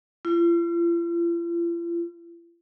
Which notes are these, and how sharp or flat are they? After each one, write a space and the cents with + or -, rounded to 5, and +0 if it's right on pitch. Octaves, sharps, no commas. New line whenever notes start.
F4 -45